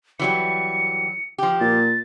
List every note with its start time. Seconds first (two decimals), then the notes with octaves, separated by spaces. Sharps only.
0.19 E3 F#3 G3 C#7
1.38 F3 G4
1.61 A#2 A6